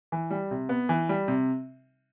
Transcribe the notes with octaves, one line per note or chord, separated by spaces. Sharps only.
E3
G3
C3
B3
E3
G3
C3